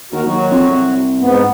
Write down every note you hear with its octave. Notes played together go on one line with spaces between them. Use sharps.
D#2 F#4 A#4
D#2 F#3 F#4
F2
C2
G#2 B3